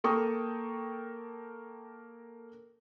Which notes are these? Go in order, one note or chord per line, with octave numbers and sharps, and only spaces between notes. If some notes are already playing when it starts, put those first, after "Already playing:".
A#3 A4 A#4 G5 C#6 D#6